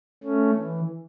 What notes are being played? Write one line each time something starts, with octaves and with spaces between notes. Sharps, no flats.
A3 C#4
E3